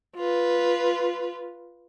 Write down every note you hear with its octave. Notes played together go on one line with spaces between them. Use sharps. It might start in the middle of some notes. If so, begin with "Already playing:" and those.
F4 B4